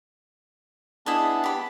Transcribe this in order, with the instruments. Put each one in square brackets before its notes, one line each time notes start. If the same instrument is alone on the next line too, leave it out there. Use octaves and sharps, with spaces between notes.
[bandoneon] B3 D4 G#4 [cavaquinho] E4 D#5 A5
[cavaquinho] G4 B5